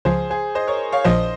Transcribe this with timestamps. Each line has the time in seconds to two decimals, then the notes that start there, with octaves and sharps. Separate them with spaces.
0.05 C#2 C#3 F3 G#4 C5
0.30 G#4 C5
0.55 C5 D#5
0.67 A#4 C#5
0.92 C#5 F5
1.04 A#1 A#2 F3 C5 D#5